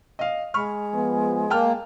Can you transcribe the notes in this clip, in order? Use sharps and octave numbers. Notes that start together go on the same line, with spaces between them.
D#5 F5
G#3 B5 C#6 F6
F3 B3
A#3 G5 A5 F6